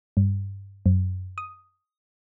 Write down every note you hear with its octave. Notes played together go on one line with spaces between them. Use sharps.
G2
F#2
D#6